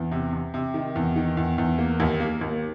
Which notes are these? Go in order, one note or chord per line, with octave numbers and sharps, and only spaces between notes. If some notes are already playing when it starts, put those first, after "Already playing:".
Already playing: E2
C3
C3
C3
D#3
E2
D#3
E2
E2
A#3
D#2
A#3
D#2